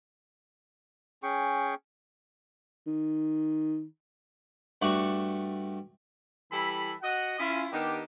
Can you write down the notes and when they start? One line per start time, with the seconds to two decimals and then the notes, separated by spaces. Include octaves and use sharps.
1.23 C#4 G#4 G5 C#6
2.87 D#3
4.82 G2 A3 F#4 D5 C#6
6.52 E3 G3 E4 A4 B5
7.02 F#4 D#5 F#5
7.39 C#4 E4 F4
7.72 D#3 B3 D4 D#4 G4